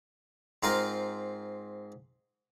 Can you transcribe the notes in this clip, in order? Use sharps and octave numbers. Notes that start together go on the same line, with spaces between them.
G#2 C4 F4 A#4 F5 A#5